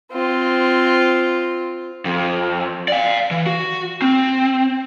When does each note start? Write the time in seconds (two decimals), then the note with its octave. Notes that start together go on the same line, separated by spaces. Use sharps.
0.12 C4 F4
2.05 F2
2.88 D5 F5
3.31 E3
3.46 F#4
4.02 C4